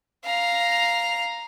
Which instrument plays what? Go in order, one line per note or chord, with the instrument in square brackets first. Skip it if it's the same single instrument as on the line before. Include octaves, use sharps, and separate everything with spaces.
[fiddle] F5 A#5